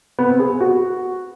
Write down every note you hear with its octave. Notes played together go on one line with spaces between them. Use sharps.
B3
C4
G#4
G#4
F#4